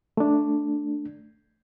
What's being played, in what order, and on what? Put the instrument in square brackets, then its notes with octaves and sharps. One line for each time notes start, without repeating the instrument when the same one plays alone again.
[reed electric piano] A3 D4